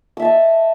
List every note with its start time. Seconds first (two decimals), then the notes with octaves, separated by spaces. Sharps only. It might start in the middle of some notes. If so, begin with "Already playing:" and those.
0.17 E6
0.20 E5
0.22 A5
0.25 D#5